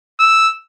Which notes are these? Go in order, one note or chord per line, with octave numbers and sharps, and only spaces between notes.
E6